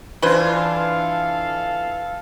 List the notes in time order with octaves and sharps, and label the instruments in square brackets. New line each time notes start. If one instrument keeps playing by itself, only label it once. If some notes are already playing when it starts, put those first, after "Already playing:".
[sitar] E3 D4 F4 [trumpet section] A4 F5 [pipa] B4 C5